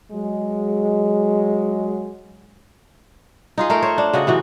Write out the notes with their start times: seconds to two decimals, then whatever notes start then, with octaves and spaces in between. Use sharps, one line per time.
0.11 F#3 G#3
3.58 D#4 F4 G#4
3.70 A3 A#4 F5 G5
3.82 C5 C#5
3.98 D4
4.13 C#3 F#4 D#5 F#5
4.27 C3 E3 F#4